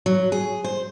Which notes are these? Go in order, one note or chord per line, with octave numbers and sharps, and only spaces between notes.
F#3
G#4
C5